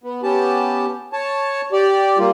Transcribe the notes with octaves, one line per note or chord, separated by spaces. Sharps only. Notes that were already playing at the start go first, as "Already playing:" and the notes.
B3
B3 C#4 G4 A5
C#5 A5
G4 D5
G3 A#3 F4